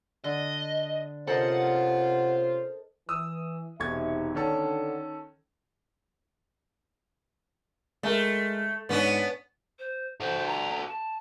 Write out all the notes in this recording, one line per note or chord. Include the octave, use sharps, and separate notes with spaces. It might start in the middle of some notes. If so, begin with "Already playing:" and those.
D3 D#5
C3 C#4 F4 A4 A#4 C5 D#5 F#5
E3 D#6 E6
E1 C3 D#4 E5 C#6 G#6
D3 D#3 C#4 A4
G#3 A3 A#4
G#2 B3 C#4 D4
C5
F#4 A4 C5
A#5
A5